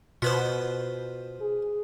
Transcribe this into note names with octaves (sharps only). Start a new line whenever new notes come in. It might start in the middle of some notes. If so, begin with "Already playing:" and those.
B2 F4 B4 C5
G#4